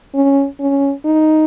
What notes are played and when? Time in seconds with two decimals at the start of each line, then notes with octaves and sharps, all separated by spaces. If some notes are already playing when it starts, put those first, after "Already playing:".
0.15 C#4
0.60 C#4
1.05 D#4